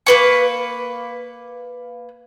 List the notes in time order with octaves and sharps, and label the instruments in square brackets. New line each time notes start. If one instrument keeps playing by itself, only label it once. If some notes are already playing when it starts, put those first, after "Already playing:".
[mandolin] A#3 B4 C#6